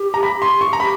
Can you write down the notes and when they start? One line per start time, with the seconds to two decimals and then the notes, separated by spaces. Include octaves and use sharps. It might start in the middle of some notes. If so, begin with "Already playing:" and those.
Already playing: G4
0.14 A#5
0.23 B5
0.42 C6
0.61 C#6
0.73 A#5
0.80 G4 B5